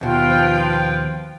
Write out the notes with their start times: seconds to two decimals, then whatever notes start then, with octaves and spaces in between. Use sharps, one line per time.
0.01 D#2 B2 F4 B4 G5
0.29 F3